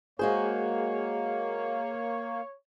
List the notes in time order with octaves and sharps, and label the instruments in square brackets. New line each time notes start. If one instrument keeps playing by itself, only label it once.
[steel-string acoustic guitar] G#3 F#4 C5 [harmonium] A#3 [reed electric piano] G#4 [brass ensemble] C#5